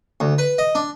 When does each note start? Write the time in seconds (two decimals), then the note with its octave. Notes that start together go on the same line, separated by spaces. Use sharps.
0.20 D2
0.38 B4
0.58 D#5
0.75 D4